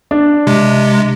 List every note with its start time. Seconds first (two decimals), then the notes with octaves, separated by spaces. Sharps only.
0.11 D4
0.47 C3 G#3